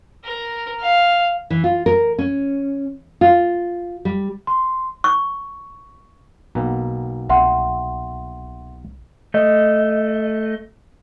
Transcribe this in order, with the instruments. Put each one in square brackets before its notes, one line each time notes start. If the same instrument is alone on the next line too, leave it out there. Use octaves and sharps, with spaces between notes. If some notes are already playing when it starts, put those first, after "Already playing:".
[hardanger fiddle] A#4
F5
[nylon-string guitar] E3
F4
A#4
C#4
F4
G3
[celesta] C6
[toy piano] C#6
[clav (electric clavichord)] B1 B2 A#3
[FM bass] C2 [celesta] E5 F#5 C6
[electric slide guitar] A3 D#5